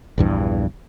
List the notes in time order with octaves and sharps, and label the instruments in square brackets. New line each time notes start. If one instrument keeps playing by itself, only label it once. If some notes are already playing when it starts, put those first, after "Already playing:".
[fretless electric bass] A#1 E2 G2 E3